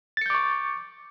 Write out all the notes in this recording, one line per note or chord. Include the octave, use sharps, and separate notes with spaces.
C#6 D6 G6 A6 C#7